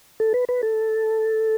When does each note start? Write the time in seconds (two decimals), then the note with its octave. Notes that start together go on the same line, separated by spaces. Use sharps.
0.20 A4
0.34 B4
0.49 B4
0.63 A4